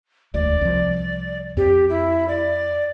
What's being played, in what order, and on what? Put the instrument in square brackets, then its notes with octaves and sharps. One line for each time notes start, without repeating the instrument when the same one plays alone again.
[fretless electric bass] E1 D2 [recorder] D5
[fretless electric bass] C2 F3
[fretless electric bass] F2 [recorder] G4
[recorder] E4
D5